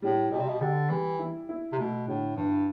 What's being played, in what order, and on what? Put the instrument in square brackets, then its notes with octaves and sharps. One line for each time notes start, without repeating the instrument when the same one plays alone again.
[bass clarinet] A2 [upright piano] G3
[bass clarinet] B2 [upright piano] G4
[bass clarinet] C3
B2
[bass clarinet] D3 [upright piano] G4
[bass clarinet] E3 [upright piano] G3
[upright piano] E4
E4
[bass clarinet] C3
[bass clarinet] B2 [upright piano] A3
[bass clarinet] A2 [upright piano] D3
[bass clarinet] G2 [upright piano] E3